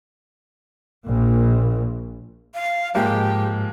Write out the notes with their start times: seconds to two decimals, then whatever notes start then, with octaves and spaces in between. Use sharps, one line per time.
1.06 A#1 A#2
2.54 F5
2.95 G#2 F3 G#3 A#3 G4